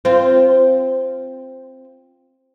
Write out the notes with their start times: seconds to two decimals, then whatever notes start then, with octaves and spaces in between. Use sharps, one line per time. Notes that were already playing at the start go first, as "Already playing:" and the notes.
0.05 C4 F4